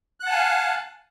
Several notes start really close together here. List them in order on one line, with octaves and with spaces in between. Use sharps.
F#6 F#5 A5 G#5 F5